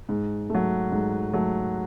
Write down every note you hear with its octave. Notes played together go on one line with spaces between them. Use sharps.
G#2
F#3 A3
G#2
F#3 A3